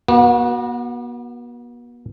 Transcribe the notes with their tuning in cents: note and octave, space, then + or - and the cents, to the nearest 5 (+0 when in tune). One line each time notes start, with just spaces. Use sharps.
B3 -45 F#4 +0